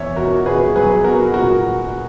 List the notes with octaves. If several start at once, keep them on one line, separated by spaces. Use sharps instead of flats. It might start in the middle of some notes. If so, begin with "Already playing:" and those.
Already playing: E2 C#5 E5
B2 F#4 A#4
B2 G#4 B4
F#3 G#4 B4
B3 F#4 A#4
A#2 F#4 A#4